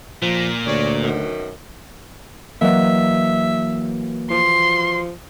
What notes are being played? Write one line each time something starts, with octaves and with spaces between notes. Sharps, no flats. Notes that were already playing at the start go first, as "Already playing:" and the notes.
A#2 F3
D2 C#5 D5
F#2 B2 D#3
E3 F#3 A#3 D#5 E5
F3 C6